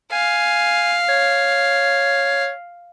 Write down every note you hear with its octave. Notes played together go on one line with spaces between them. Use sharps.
F5 G#5
C#5